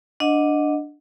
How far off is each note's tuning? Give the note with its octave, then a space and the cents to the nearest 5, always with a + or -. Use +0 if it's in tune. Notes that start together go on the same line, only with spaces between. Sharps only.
D4 +0 D#5 +0 F#5 -20